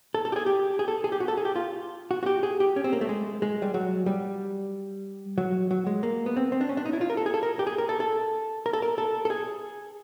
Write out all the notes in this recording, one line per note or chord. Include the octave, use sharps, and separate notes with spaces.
A4
A4
G4
G#4
G4
G#4
A4
G#4
G4
F#4
A4
G#4
G4
F4
F#4
F#4
G4
G#4
G4
C#4
C4
A#3
A3
G#3
G#3
G3
F#3
G3
F#3
F#3
G#3
A#3
B3
C4
C4
D4
C#4
D4
D#4
E4
F4
A#4
A4
G#4
A4
A#4
G4
G#4
A#4
A4
A4
A#4
A4
A#4
A4
A4
G#4